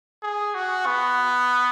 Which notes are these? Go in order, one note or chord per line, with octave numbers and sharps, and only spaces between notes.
G#4
F#4
B3